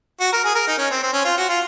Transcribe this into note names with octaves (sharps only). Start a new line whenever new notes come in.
F#4
A#4
G#4
A#4
D#4
C#4
C4
C4
C#4
F4
F#4
F4